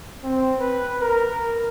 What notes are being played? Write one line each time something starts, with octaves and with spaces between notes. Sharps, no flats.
C4
B4
A#4